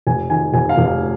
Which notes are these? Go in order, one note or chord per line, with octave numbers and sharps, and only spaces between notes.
F1 G#5
D#3 G#5
F1 G#5
F5
F1
F5